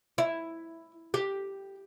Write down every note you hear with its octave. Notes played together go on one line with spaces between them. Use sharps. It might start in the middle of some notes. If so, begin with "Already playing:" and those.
E4
G4